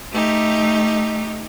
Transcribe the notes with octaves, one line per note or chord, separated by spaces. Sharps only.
A3 D#4 G4